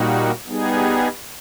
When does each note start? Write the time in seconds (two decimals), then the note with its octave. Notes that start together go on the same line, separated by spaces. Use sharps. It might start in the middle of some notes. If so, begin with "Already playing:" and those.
Already playing: A#2 G3 A#3 D#4 F#4
0.47 G3 B3 D#4 G#4